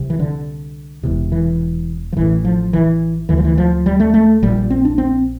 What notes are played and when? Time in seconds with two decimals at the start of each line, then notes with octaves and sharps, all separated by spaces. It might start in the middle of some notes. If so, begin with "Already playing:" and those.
Already playing: C2 C3
0.10 E3
0.19 D3
1.03 E1 E2 C3
1.32 E3
2.13 F3
2.17 A1 A2 E3
2.45 F3
2.73 E3
3.29 D2 D3 E3
3.38 F3
3.44 E3
3.58 F3
3.86 G3
4.00 A3
4.14 A3
4.42 A#1 A#2 G3
4.70 C4
4.85 D4
4.98 C4